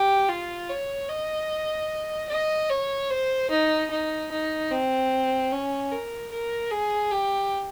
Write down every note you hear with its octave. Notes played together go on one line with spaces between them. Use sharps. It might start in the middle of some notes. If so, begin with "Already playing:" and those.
Already playing: G4
F4
C#5
D#5
D#5
C#5
C5
D#4
D#4
D#4
C4
C#4
A#4
A#4
G#4
G4